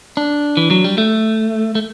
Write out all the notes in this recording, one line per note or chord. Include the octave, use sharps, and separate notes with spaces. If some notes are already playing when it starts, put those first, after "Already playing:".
D4
E3
F#3
G3
A3
A3